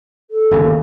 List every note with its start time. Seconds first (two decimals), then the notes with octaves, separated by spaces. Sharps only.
0.30 A4
0.51 G1 D#2 C#3